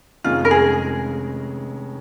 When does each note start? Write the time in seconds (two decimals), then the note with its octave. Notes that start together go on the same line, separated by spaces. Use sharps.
0.24 F1 F2 D#3 G#3 C#4 F4
0.45 A#4
0.51 G#4